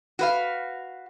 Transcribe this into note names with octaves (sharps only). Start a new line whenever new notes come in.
F#4 B4 F5